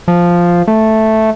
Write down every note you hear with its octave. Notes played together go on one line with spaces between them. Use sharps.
F3
A3